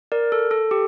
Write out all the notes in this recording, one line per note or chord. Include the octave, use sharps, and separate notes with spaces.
A#4 D5
A4
A4
G4